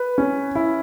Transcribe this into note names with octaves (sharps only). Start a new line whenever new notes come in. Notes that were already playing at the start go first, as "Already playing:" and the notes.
Already playing: B4
C#4
E4